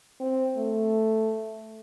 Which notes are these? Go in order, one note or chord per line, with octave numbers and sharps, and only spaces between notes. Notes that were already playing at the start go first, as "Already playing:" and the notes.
C4
A3